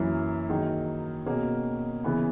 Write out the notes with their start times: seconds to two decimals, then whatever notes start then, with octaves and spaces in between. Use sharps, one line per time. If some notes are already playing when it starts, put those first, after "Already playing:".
Already playing: F#2 E3 A#3 C#4 E4
0.49 D#3 F#3 A#3 D#4 G#4
1.26 B2 A#3 C#4 G#4
2.04 C#3 E3 B3